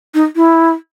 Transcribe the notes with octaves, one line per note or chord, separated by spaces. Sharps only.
D#4
E4